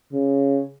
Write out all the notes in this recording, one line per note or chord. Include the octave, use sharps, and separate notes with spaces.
C#3